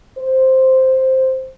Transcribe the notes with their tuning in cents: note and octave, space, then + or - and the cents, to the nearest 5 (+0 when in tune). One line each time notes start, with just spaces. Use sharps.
C5 +0